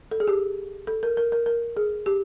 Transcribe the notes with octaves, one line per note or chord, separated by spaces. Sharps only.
A4
G#4
G4
A4
A#4
A#4
A#4
A#4
G#4
G4